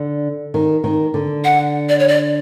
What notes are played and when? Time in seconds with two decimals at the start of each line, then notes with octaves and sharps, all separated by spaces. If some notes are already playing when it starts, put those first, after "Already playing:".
Already playing: D3
0.54 D#3
0.84 D#3
1.14 D3
1.44 F#5
1.89 D5
1.99 C#5
2.08 D5